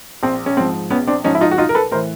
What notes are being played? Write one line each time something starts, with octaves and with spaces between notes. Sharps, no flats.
A#1 C4
C#4
G#2 F3 C4
A#1 B3 C#4
C4 D4
G#2 F3 C#4 D#4
E4
D#4 F4
F#4
B1 D#4 F4
A#4
A4 B4
A2 E3 A#4 C5